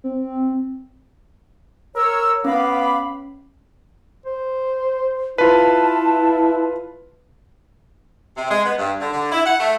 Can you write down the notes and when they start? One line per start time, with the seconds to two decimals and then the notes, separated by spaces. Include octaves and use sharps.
0.04 C4
1.95 A#4 C#5 E6
2.45 B3 C#4 F5 B5 D6
4.26 C5
5.38 E4 F4 B4 A5
8.37 C3
8.51 G#3
8.65 B3
8.78 G2
9.01 D3
9.13 D3
9.32 E4
9.46 F#5
9.60 A3